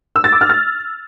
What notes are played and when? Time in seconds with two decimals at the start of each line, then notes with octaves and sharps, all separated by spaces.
0.16 E6
0.24 A6
0.33 D6
0.41 F6
0.50 A6